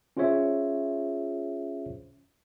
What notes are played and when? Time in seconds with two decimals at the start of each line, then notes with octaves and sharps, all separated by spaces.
0.17 C#4 F4 G#4 C5 C#5 E5